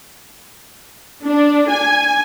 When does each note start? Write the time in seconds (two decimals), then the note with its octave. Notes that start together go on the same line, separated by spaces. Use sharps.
1.24 D4
1.70 G#5